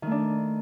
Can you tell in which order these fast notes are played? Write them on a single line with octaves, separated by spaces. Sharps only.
D#3 A3 D4